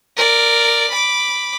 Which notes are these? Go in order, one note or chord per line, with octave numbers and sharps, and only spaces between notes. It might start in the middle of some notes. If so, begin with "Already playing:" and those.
A#4 D5
B5 D6